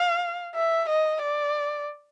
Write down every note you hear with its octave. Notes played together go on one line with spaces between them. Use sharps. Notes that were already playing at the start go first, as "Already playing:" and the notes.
Already playing: F5
E5
D#5
D5